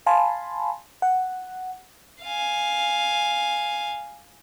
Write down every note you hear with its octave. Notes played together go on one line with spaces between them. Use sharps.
F5 G#5 A5 B5 C6
F#5
F5 G#5